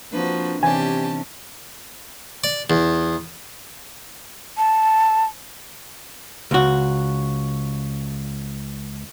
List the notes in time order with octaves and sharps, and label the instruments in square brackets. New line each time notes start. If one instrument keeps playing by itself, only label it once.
[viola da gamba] F3 F#4 [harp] A#3 C4 D4 [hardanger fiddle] B4
[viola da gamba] C3 C#4 [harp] E3 D5 [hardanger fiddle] G4 A5 [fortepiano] G#5
[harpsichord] D5
E2
[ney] A5
[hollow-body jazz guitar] C#2 F#4